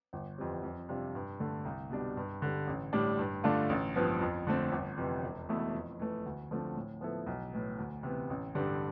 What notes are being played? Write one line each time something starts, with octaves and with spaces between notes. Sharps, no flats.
G1
F2 E3 G3 C4
F2
C3 G3 D4 F4
G2
D3 A3
C2
B2 G3 D4
G2
D3 G3
A1
A2 G3 D4
G2
D3 A3 D4 F4
A1
G2 F3 B3
F2
D3 A3 C4
G1
F2 C3 E3
E1
E2 B2 A3 E4
F2
E3 A3
D2
D3 F3 A3 C4
A2
F3 B3 E4 A4
B1
A2 E3
D2
C3 E3 B3
A1
G2 D3 G3